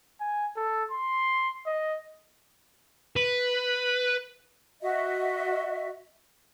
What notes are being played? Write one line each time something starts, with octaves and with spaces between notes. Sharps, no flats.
G#5
A4
C6
D#5
B4
F#4 D#5 E5